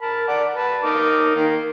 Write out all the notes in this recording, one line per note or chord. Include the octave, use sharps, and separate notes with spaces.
A#4 A5 B5
D5 F#5
B4 A5
D#4 A#4 D6
D#3 A#3